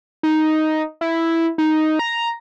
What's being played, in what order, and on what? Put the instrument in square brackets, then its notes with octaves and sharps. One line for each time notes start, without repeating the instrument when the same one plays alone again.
[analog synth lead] D#4
E4
D#4
A#5